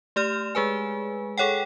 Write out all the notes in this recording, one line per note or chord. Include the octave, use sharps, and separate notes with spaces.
A3 G4 D5 F6 E7
G#3 G#4 B4 G#5
G#4 A4 C#5 F#5 G5